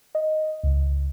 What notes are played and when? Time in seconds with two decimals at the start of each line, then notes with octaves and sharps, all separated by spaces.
0.15 D#5
0.63 C#2